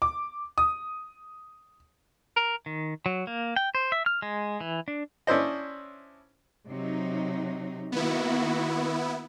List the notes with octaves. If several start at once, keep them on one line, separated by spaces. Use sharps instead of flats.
D6
D#6
A#4
D#3
F#3
A#3
G5
C5
E5
F6
G#3
E3
D4
C#4 D4 E4 C5 D#5
C3 F#3 D#4
D#3 A#3 B3 E4 F#4